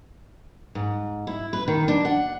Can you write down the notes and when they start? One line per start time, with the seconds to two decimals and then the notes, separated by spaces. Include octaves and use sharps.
0.75 G#2
1.27 E4
1.53 B4
1.68 D#3
1.88 D4
2.05 F#5